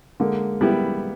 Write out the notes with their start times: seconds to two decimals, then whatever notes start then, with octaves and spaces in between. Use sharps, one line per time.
0.20 D3 G#3 A#3
0.61 G3 B3 E4 G4